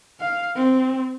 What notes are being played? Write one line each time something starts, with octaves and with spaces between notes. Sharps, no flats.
F5
C4